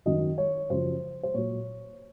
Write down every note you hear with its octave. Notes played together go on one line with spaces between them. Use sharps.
F#2 D#3 F#3 D#5
C#5
F#2 C#3 F3 C5
C5
A#2 F#3 C#5